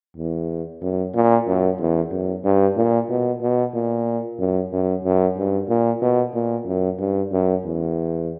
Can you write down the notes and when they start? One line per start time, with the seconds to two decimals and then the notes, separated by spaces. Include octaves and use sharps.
0.17 E2
0.82 F#2
1.14 A#2
1.47 F#2
1.79 E2
2.11 F#2
2.45 G2
2.77 A#2
3.10 B2
3.42 B2
3.74 A#2
4.39 F#2
4.72 F#2
5.04 F#2
5.37 G2
5.69 A#2
6.02 B2
6.34 A#2
6.67 F#2
6.99 G2
7.32 F#2
7.65 E2